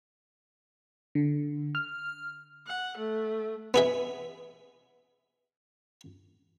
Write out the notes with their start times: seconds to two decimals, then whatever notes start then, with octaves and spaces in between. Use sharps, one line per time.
1.15 D3
1.75 F6
2.67 F#5
2.98 A3
3.74 B3 G#4 E5